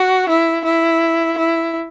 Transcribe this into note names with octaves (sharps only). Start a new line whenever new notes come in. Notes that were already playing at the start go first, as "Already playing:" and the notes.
Already playing: F#4
E4
E4
E4